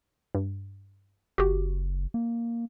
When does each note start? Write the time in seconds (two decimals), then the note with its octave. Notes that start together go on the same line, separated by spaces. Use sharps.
0.35 G2
1.38 F#1 F#4 G4
2.14 A#3